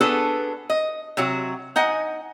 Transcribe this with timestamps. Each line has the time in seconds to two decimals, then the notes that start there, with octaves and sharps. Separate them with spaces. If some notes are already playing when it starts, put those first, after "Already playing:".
0.01 B3 D4 F#4 G#4 A4 B4
0.70 D#5
1.17 C3 F#3 F#4
1.76 D#4 D#5 F#5 G#5